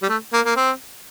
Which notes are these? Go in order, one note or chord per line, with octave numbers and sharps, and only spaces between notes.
G3
A3
A#3
A#3
C4